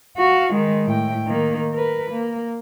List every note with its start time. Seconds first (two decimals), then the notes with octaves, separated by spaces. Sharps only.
0.17 F#4 F5
0.53 D#3 G#3
0.85 A2 G5
1.27 D#3 A#3
1.73 A#4 B4
2.11 A#3